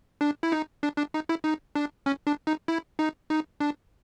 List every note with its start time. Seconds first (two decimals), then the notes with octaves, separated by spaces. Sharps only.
0.21 D4
0.43 E4
0.52 D#4
0.83 D4
0.98 D4
1.14 D#4
1.29 E4
1.44 D#4
1.75 D4
2.06 C#4
2.27 D4
2.47 D#4
2.68 E4
2.99 D#4
3.30 D#4
3.60 D4